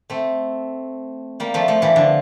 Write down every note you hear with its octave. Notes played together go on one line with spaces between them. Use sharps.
A3 C4
G3 A#3
F3 A3
F3 A3
E3 G3
D3 F3